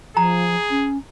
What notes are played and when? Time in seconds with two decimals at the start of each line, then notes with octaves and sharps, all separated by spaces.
0.17 F3 G#4 A#5
0.71 C#4